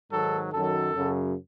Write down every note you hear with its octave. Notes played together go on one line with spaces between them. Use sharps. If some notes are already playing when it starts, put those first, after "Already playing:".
G#2 D#3 F#3 A4
F#2 D#3 F#3 A4
F#2 C#3 F#3